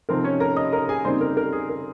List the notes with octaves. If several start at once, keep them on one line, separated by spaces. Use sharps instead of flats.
C3 F3 C4 D#4 A#4
C#4 C#5
A#4 A#5
D#5 D#6
A#4 A#5
G#4 G#5
C#3 G3 A#3 C4 D#4 C5
A#4
A#4
G#4
A#4